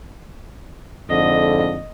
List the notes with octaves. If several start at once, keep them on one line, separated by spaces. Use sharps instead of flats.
F2 G#2 D3 D#5